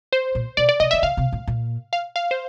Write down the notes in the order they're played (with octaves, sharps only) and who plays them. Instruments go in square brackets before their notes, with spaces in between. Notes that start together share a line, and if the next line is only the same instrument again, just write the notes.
[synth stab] C5
[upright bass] A#2
[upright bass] B2 [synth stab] D5
[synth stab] D5
[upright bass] C3 [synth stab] D#5
[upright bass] D3 [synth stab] E5
[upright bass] C#3 [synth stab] F5
[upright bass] C3
A2
A#2
[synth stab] F5
F5
C5